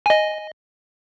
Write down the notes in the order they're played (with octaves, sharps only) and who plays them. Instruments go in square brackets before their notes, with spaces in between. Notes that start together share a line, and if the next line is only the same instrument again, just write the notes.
[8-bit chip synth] D#5 G#5